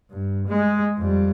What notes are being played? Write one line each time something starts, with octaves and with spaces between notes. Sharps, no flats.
G2
G#3
F2 G3